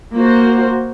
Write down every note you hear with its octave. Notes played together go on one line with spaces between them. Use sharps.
A#3 F#4 C5